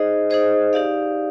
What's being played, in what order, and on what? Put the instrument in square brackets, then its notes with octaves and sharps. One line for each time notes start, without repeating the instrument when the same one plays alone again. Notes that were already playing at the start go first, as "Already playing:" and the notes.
Already playing: [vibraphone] D#4 G#4 C5 D#5
D#4 G#4 C5 D#5
D#4 G4 D5 F5